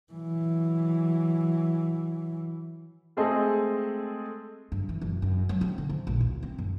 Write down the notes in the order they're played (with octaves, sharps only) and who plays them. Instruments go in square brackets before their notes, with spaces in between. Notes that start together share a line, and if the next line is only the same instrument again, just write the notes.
[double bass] E3 F#3
[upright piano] G#3 A3 C4 G#4 A4 D#5
[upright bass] G2
E3
F#1
F#2
F#3
C4
D3
F3
A#1
D2
C4
F#2